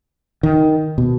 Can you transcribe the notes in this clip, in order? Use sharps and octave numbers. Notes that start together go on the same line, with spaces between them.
D#3
B2